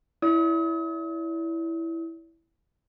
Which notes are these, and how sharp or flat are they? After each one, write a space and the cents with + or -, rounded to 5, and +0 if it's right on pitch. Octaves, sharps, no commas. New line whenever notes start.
E4 +0 D5 -40 D#6 +40